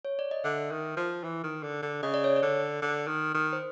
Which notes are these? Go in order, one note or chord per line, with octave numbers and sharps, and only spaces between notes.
C#5
D5
D#5
D3 E5
D#3
F3
E3
D#3
D3
D3
C#3 D#5
D5
C#5
D5
D3
D3
D#3
D#3
C5